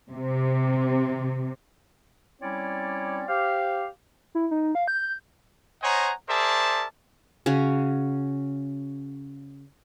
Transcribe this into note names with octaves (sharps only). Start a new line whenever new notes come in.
C3
G3 C4 C#4 E4 C#5 D5
G4 C5 F5
E4
D#4
F5
G6
C5 C#5 D#5 F#5 G#5 A#5
G#4 A#4 C5 D5 E5 A5
C#3 C#4 F#4